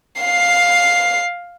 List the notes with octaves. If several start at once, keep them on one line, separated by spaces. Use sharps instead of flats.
F5 C7